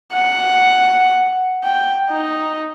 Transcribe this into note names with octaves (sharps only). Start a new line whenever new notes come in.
F#5
G5
D#4